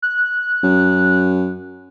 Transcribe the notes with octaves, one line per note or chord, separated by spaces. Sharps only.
F#6
F#2